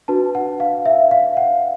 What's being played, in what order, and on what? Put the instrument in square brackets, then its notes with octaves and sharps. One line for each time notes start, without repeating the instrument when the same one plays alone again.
[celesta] D4 F#4 B4 A5
F#5
F5
E5
F5
F#5